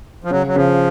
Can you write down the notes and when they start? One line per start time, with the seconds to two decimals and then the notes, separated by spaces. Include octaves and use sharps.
0.24 F3
0.30 C#3 F#3
0.47 F#3
0.56 C#3 F3